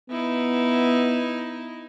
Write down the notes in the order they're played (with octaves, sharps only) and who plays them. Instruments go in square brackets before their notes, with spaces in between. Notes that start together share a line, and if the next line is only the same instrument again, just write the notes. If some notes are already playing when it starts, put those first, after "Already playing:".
[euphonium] B3 [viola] D#4 E4